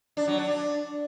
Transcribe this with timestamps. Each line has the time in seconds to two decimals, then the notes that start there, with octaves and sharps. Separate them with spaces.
0.17 D4
0.27 F#3
0.38 D4
0.48 D4